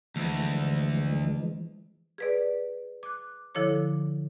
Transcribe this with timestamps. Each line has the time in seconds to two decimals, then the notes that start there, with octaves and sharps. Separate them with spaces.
0.16 D2 E3 F3 G#3
2.18 G#4 B4 D5
3.03 D6 F#6
3.55 D3 F3 E4 A4 C#5 D6